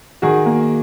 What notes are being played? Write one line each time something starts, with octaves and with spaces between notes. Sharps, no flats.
D#3 F#4 G#4
A#3